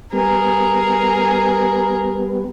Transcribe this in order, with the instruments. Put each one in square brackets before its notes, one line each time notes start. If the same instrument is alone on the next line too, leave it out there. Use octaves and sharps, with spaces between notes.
[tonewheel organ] G3 B3 [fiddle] G#4 A#4